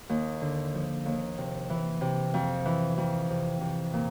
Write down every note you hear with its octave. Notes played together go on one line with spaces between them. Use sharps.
D#2
D3
F3
D#2
C3
E3
C3
F2
E3
F2
C3
C3
A#2